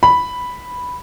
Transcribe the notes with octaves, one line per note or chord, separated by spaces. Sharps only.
B5